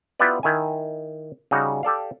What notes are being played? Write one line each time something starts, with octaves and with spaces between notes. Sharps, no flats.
B3 E4 F4 G4 B4 D5
D#3 E4 G#5
C#3 G3 D#4 F#4
G4 A4 D5 F5